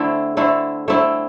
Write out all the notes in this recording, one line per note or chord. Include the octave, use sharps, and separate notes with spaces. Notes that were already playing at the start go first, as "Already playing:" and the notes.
Already playing: D3 A3 C4 E4
D3 A3 C4 E4
D3 A3 C4 E4